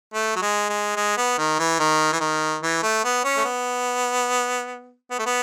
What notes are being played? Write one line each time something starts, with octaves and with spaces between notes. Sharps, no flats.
A3
F#3
G#3
G#3
G#3
B3
D#3
E3
D#3
E3
D#3
E3
A3
B3
C#4
A3
B3
B3
A3
B3